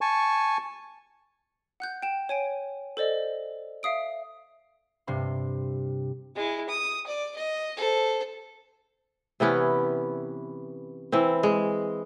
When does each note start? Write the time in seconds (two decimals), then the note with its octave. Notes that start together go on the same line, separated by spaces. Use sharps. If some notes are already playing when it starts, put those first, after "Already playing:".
0.01 G#5 A5 C#6
1.80 F#5 F#6 G6
2.02 G5 E7
2.29 C#5 G#5 D7
2.97 A4 C5 D5 D#5
3.83 E5 F5 D#6 D7
5.07 G2 C3 C6
6.36 G#3 E4
6.70 D#6
7.07 D5
7.37 D#5
7.77 A4 C5
9.40 C3 E3 B3 C#4
11.12 E3 C4
11.43 G#3